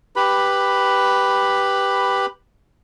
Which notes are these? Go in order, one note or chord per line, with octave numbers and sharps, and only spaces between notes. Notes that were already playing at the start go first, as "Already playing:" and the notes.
G4 B4 B5